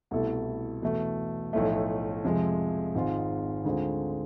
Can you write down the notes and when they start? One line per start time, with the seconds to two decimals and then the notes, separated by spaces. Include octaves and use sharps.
0.11 C2 B2 A3 E4 A4
0.82 E2 B2 A3
1.53 B1 A2 F3 A3
2.24 F2 C3 F3 G#3
2.95 G#1 G#2 G#3 C4 F4
3.64 D2 D3 G#3 C4 F4